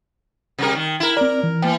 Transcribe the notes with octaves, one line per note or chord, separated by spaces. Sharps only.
C3 G3 A#4
D#3
E4 A#4
C4 A#4 D5
E3
E3 A#3 G5